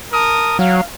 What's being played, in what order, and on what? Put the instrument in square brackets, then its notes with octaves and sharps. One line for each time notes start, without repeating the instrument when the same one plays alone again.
[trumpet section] A#4 A5 D#6
[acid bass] F#3 [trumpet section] F5